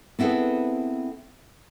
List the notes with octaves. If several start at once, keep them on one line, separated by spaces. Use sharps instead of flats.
B3 C4 E4 G#4 A4 B4